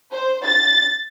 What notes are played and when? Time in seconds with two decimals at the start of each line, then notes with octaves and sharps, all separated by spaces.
0.11 C5
0.44 A6